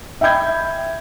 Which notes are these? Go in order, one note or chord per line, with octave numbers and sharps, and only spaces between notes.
E5 G5 B5 G6 G#6